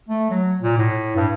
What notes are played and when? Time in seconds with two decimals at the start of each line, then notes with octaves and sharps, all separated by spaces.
0.09 A3
0.31 F#3
0.62 A#2
0.78 A2
1.16 G2